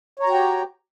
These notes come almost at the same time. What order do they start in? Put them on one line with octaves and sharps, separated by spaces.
C#5 A#5 F#4 G5 G4